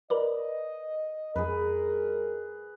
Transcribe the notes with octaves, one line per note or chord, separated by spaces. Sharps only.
A#4 B4 D5 D#5
F2 G#3 G#4 A#4 B4